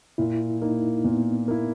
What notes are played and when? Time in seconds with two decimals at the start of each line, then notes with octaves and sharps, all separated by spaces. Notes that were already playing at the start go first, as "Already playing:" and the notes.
0.18 A#2 E4
0.62 A#3 D#4 E4
1.05 A#2 B3
1.48 A#3 E4